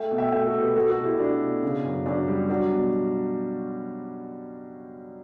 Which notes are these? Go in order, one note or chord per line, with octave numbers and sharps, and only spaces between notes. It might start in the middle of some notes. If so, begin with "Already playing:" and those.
Already playing: A3 E5 G5
B2
E5 G5
A3 E5 G5
F#4 A4
B2
G4 B4
A3 F#4 A4
F#4 A4
B2
E4 G4
A3 D4 F#4
B2
C#3
F#2
F#2 D4 F#4
G3
F#3 D4 F#4
B2